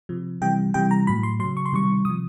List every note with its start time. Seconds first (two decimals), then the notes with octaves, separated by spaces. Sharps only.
0.09 C3 F3
0.41 C3 E3 G3 G5
0.74 C3 E3 G3 G5
0.91 A#5
1.07 A2 F#3 B5
1.23 C6
1.40 C#3 F#3 C6
1.57 C#6
1.65 C6
1.72 C3 D#3 G3 C#6
2.05 C3 F3 D#6